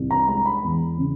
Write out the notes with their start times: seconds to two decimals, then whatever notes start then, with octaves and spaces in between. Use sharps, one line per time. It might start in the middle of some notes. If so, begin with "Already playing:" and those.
Already playing: C2
0.11 A#5
0.28 G#3 A#5
0.46 B5
0.64 E2
0.98 C#3